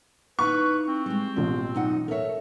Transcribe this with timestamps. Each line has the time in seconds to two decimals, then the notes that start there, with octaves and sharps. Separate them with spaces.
0.39 D#4 E4 B4 F5 C#6
0.88 C4
1.06 G3 G#3
1.36 A1 B2 F4
1.75 F#2 D#4 F#5
2.08 A4 A#4 C#5 E5